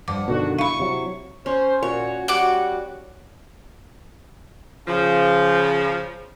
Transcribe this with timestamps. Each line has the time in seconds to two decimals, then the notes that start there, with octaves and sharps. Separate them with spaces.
0.08 G2 F3 F#5 D6
0.28 B2 D3 D#3 F#4
0.59 E4 F5 B5 C#6
0.79 C3 F#3
1.46 C#4 C5
1.83 A#2 F#4 C#5
2.28 G3 F#4 F#5 D6
4.87 C#3 F3